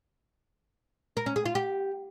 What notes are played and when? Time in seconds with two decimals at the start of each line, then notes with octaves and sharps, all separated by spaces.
1.17 A#4
1.26 C#4
1.36 G#4
1.45 F4
1.55 G4